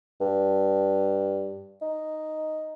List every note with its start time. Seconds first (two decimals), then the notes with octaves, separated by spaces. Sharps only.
0.21 G2
1.82 D#4